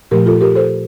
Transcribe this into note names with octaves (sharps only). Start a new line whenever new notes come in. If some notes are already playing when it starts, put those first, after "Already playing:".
A#2 F3 A3 G4 A#4
F4 A4
G4 A#4
A4 C5